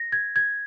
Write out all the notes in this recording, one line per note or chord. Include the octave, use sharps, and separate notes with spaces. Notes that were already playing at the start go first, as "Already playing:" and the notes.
Already playing: A#6
G#6
G#6